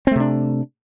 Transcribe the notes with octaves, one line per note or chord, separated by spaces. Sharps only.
C3 A3 C4 D4